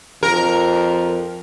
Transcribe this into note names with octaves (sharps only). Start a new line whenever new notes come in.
F2 A#4